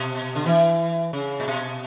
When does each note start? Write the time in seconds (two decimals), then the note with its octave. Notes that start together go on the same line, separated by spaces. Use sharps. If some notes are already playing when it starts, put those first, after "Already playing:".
Already playing: B2
0.35 D3
0.46 E3
1.13 C#3
1.40 A#2
1.48 B2